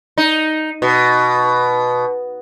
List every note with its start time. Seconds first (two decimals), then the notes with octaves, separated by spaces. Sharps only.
0.18 D#4
0.82 B2